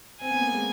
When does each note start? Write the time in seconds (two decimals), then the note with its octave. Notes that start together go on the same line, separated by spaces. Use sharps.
0.21 C4 G#5
0.31 B3
0.41 A#3
0.52 G#3